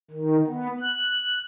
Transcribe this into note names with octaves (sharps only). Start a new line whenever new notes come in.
D#3
B3
F#6